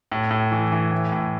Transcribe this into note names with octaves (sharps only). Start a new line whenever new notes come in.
A2
A2
E3
E3
A2
A2